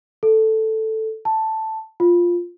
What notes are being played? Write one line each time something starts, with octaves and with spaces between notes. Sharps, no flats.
A4
A5
F4